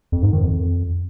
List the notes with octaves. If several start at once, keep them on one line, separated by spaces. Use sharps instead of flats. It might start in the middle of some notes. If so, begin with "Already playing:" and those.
F2
G#2
D#3
F2